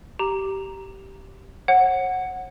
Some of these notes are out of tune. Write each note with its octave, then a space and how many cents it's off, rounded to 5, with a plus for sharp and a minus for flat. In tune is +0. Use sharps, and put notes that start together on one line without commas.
G4 -15 A#5 +0
C#5 -45 F#5 +0